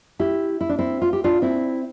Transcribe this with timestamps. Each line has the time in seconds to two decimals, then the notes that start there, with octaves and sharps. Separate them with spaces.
0.19 E4 G4
0.61 E4
0.69 D4
0.79 C4 E4
1.01 F4
1.13 G4
1.24 D4 F4
1.42 C4 E4